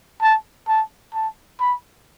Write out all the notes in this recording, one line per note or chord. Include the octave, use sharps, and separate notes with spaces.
A5
A5
A5
B5